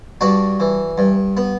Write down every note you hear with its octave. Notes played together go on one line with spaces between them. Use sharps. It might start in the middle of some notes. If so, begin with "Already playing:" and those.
G2 D4 F#4
E3
G2
B3